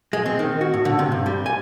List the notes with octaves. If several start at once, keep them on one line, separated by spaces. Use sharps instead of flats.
G#3
C4
D#3
F#4
A2
D3
C3
G2
G3
G#5